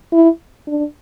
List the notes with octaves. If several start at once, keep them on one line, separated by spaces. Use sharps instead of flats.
E4
D4